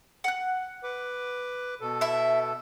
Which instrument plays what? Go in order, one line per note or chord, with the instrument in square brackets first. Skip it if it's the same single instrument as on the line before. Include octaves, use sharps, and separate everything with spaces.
[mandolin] F#5 F#6
[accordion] B4 D6
B2 A4
[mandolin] E4 E5